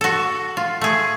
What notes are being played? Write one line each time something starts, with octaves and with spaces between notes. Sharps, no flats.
F#4 A4
F4
A3 G#4